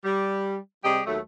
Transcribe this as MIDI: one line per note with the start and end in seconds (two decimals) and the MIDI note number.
0.05 0.56 55
0.84 1.02 48
0.84 1.02 55
0.84 1.02 67
0.84 1.02 68
0.84 1.02 75
1.06 1.19 39
1.06 1.19 54
1.06 1.19 57